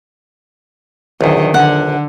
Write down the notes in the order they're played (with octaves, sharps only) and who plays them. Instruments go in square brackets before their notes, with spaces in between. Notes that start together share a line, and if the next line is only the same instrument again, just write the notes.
[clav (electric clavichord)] A#1 E2 [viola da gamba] D3 D#3 F#3
[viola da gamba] D3 [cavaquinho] F#5